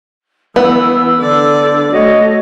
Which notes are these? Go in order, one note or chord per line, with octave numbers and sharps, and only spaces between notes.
E3 B3 E6
D3 D5
A3 F#4 C#5 D#5